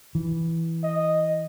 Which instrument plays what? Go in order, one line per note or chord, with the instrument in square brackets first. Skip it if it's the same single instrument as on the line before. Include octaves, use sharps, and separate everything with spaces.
[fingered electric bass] E3
[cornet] D#5